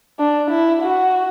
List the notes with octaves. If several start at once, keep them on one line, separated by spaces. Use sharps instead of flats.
D4
E4
F#4